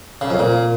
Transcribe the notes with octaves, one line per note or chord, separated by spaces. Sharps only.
C#3
F2
A#2